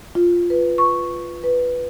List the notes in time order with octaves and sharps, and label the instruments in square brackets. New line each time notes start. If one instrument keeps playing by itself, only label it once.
[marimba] F4
B4
C#6
B4